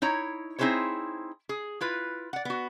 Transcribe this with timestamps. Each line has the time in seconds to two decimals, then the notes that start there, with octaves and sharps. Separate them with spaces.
0.02 D#4 E4 C#5 A#5
0.59 C4 D#4 E4 G#4 C5 C#5
1.49 G#4
1.81 E4 F4 B4
2.33 D5 F#5
2.45 B3 F#4